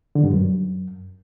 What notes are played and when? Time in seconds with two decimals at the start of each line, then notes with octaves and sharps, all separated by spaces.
0.15 D3
0.23 G2
0.32 F#2